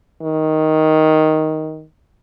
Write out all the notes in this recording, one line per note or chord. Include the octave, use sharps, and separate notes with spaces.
D#3